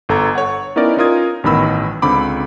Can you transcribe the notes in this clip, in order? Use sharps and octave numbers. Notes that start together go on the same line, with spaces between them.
G1 A4 A#5 G#6
C#5 F#5
B3 C#4 D#4 E4 A#4 D5
C#4 D#4 F4 A#4 D#6 G#6
A1 G2 D#3 B3 B5 E6
C#2 D3 C4 B5 D6